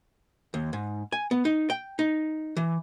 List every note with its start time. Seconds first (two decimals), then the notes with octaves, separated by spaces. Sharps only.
0.54 D#2
0.73 G#2
1.12 G#5
1.31 B3
1.45 D#4
1.70 G5
1.99 D#4
2.57 E3